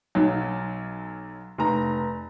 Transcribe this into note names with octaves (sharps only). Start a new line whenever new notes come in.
B1 F#3
F1 A#5